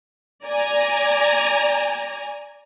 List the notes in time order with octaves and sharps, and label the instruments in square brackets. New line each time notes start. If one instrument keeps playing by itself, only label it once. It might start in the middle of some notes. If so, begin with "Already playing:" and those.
[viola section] D5 G#5 A#5